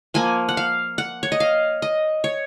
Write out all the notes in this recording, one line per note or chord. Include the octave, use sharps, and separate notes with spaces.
F3 A#3 G#5
F#5
F5
F#5
C#5
D#5
F5
D#5
C#5